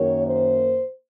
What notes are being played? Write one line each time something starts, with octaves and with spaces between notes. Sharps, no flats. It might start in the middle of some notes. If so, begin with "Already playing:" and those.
Already playing: F#2 D#3 F#3 A#3 C#5
C5